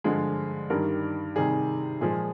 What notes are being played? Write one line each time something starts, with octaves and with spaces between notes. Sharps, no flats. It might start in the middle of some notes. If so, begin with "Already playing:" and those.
G2 D3 F3 G#3
G2 D#3 G3 A#4
C3 D#3 G3 G#4
A#2 F3 G#3 G#4